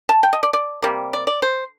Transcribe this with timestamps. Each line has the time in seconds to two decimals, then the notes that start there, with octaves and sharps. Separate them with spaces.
0.09 A5
0.23 G5
0.33 D#5
0.43 D5
0.53 D5
0.82 C3 G3 A#3
1.13 D5
1.27 D5
1.42 C5